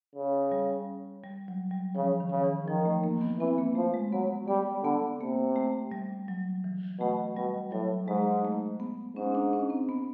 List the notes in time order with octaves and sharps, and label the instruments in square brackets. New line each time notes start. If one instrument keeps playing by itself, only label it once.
[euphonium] C#3
[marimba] G3
G3
F#3
G3
[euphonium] C#3 [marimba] F3
[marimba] D#3
[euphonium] C#3
[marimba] E3
[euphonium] D#3 [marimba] F3
[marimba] A3
A#3
B3
[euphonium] E3 [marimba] C4
[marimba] A#3
[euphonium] F3 [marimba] A3
[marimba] G#3
[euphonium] F#3 [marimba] B3
[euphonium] G3 [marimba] B3
[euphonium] D3 [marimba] B3
[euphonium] C3 [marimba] A#3
[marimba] A3
G3
F#3
E3
[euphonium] B2 [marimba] A3
[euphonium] B2 [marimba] G3
[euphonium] A2 [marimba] F#3
[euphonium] G#2 [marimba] G#3
[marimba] A3
B3
[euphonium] G#2 [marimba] C#4
[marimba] D4
C#4
C4
B3